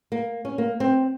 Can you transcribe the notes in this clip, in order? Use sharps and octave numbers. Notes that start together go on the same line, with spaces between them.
A#3
C#4
A#3
C4